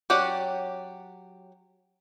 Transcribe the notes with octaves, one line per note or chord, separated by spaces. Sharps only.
F#3 C#4 G4 D5 F#5